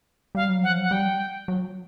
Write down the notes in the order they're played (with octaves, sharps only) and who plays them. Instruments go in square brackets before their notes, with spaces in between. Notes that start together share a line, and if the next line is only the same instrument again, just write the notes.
[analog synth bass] G3 [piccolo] F5
[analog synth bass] F#3
[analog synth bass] F3 [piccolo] F#5
[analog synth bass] F#3
[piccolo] F#5
[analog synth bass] G3 [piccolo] G5
[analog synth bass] F#3